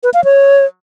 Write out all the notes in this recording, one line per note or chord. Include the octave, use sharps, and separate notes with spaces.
B4
F5
C#5